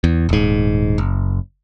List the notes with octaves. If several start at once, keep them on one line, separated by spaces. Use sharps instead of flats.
E2
D#1 G#2
F#1